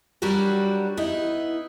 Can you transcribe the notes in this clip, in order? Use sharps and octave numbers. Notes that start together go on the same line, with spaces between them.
F#3 G3 D4 F#4 G4 A#4
B3 D#4 E4